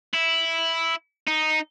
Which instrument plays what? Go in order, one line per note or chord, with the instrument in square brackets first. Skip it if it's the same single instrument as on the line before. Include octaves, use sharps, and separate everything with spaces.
[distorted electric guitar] E4
D#4